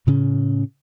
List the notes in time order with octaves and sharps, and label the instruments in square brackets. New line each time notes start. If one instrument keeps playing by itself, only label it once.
[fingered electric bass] A2 C#3 C#4